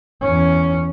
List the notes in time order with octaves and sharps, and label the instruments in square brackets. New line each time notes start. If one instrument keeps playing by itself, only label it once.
[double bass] E2 C#4